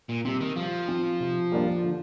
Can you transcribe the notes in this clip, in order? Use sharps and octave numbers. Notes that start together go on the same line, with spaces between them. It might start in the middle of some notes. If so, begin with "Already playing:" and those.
A#2
C3 G3 C4
D#3
F3 G3
C4 F4
C3
G3 A#3 D4 F4
D3